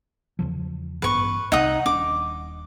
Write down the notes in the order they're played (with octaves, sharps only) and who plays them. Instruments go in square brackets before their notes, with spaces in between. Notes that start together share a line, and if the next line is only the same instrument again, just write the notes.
[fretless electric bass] E2 C#3 F3
[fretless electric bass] A1 G2 B3 [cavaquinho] B4 C#6
[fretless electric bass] C2 C3 [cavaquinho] D#4 F#5 D#6
[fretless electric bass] D#1 C#4 D4 [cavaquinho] D6